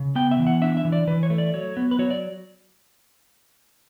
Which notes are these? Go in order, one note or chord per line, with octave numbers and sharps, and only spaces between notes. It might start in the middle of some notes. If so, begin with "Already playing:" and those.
Already playing: C#3
B3 G5
E5
E3
F#5
D4 E5
E5
E3
D5
E3 B4
C#5
A3
D5
F#3 C#5
B3
B4
F#3 C#5
D5